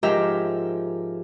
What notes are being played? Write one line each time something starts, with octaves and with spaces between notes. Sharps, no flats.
G#2 F3 G4 A#4 E5 A#5